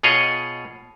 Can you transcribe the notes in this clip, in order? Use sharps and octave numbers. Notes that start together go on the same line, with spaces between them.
B2 F4 G#4 C#5 D#5